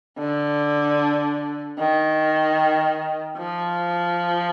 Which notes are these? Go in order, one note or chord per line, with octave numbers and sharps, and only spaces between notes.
D3
D#3
F3